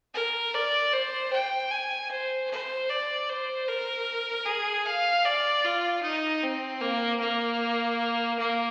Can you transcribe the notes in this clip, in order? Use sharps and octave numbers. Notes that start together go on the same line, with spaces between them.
A#4
D5
C5
G5
G#5
C5
C5
D5
C5
A#4
G#4
F5
D5
F4
D#4
C4
A#3
A#3
A#3